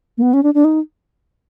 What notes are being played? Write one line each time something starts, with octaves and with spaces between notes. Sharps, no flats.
A#3
B3
C#4
D4
D4
D#4